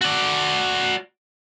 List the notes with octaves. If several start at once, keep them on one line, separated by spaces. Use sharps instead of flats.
F#4 D5